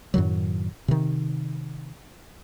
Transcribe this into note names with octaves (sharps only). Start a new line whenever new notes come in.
F#2 A2 D#3 F#3
C3 D#3